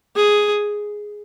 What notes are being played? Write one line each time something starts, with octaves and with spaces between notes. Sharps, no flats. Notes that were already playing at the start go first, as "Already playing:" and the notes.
G#4